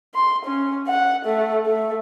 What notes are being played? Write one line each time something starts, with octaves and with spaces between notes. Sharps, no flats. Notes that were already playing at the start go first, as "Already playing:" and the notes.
C6
C#4
F#5
A3
A3